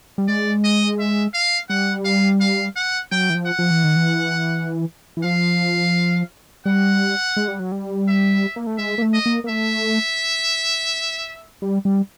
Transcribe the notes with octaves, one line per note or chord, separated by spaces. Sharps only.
G3
G#3 D5
D#5
E5
F5
G3 F#5
F5
F5
F#5
F#3 G5
E3
F3
F#5
F3
E3
D#3
E3
E3
F3 F5
G3 F#5
G#3
G3
F#3
G3
E5
A#3
A3
G#3 E5
A#3
A3
D#5
A#3
A#3
A3 E5
G3
G3